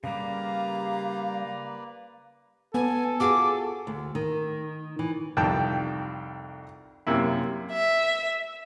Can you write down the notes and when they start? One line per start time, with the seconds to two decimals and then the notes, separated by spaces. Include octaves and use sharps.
0.04 C#3 G3 A#3 G4 B4 D5 F5 A#5
2.74 B3 A4 G#5
3.20 F4 F#4 G#4 D6
3.87 D2
4.15 D#3
4.99 E3
5.37 C2 F2 D#3 G5 A5
7.07 F#2 C3 A#3 E4
7.73 E5